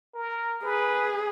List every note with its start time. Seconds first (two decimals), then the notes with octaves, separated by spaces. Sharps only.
0.15 A#4
0.63 G#4 B4